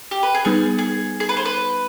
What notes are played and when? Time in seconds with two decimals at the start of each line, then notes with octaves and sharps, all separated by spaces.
0.11 G4
0.23 B4
0.34 G#4
0.45 G3 B3 D#4 G#4 B4
0.79 G#4
1.20 G#4
1.29 B4
1.37 C5
1.45 B4